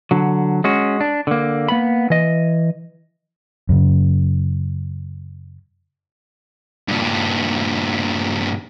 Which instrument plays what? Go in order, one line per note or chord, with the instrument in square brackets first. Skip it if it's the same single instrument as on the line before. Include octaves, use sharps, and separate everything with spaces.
[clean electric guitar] D3 F#3
G#3 C#4 F#4
D4
D3 A#3
A#3 B3 B5
E3 D#5
[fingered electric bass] F#2 C#3
[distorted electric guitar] G2 A#2